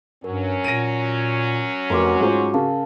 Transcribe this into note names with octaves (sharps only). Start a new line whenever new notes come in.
G2 F#3 C#4 A#4
A#2 A#6 D7 D#7
F1 F#4 A#4 A#5 C6 D6
G#2 F4 C5
C#3 A#4 F5 A5